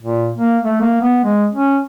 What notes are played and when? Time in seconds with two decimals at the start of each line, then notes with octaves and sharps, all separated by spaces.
0.01 A#2
0.37 A#3
0.63 A3
0.81 A#3
1.01 B3
1.24 G#3
1.52 C#4